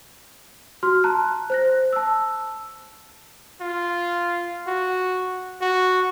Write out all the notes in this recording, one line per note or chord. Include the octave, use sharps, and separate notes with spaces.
F#4 C6 F6
A5 A#5 F#6
C5 F#6 A#6
A5 E6
F4
F#4
F#4